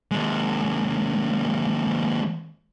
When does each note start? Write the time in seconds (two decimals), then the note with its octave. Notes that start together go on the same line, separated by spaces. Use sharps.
0.11 D#2 G#3